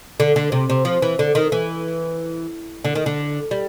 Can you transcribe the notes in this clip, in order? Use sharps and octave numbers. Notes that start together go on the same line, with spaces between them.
D3
D3
C3
C3
F3
E3
D3
D#3
E3
D3
D#3
D3
G3